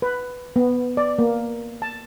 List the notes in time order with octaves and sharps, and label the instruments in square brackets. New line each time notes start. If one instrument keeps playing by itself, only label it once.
[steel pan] B4
B3
D5
A#3
A5